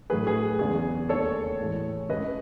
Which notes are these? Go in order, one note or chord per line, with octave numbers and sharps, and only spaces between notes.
A2 F#3 A3 G#4 B4
G#4
E2 C#3 G#3 G#4
D#2 D#3 A3 A4 C#5
A2 E3 G#3
C#2 C#3 G#3 B4 D#5